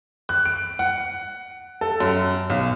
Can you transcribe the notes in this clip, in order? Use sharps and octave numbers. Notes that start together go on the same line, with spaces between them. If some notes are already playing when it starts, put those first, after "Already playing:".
F#6
D7
F#5
A4
F#2
B1